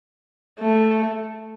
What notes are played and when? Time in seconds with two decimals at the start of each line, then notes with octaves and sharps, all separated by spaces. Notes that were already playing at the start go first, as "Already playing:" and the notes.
0.60 A3